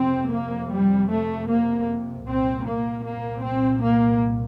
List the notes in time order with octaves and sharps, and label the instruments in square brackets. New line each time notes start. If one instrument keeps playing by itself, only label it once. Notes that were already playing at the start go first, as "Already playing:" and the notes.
Already playing: [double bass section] F2 C3 C4
A#3
G3
A3
A#3
C2 A#2 C4
A#3
A#3
C4
A#3